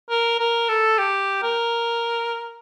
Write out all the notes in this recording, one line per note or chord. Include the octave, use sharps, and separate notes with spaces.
A#4
A#4
A4
G4
A#4